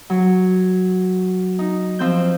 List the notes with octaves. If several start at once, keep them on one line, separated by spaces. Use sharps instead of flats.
F#3
D#4
F3 C4 G6